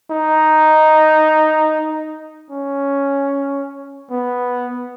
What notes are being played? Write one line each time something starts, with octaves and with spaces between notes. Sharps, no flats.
D#4
C#4
B3